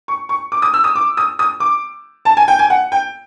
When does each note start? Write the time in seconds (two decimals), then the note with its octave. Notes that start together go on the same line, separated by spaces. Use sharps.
0.08 C#6
0.29 C#6
0.52 D6
0.62 D#6
0.74 E6
0.84 D#6
0.96 D6
1.17 D#6
1.39 D#6
1.60 D6
2.25 A5
2.37 G#5
2.48 G5
2.59 G#5
2.70 F#5
2.92 G5